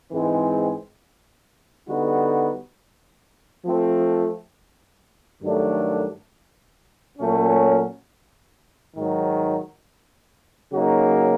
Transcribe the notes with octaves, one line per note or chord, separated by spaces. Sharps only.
G#2 E3 G#3 C4
D3 G3 B3 D#4 F#4
F3 A3 C4
G2 D#3 F#3 A3 D4
A#2 F#3 A3 C#4
G#2 D#3 F#3
C#3 F#3 A#3 D#4 F#4